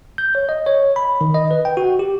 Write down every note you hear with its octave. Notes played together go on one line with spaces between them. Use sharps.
G6
C#5
D#5
C#5
B5
D#3
D#5
B4
G5
F#4
G4